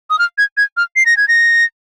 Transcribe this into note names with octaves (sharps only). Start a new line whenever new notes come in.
D#6
F6
G#6
G#6
F6
C7
A#6
G#6
A#6